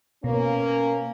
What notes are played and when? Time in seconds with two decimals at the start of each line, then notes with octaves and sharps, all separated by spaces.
0.24 B2 A#3 C#4